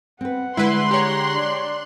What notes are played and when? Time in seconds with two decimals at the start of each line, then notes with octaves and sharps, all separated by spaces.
0.21 C4 B4 F#5
0.57 D3 G#3 E4 B4 C6 F#6
0.91 G4 C#5 A#5
1.34 D4